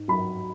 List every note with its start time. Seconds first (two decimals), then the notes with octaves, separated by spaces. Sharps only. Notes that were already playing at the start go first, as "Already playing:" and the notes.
Already playing: G#2
0.08 F#3 B5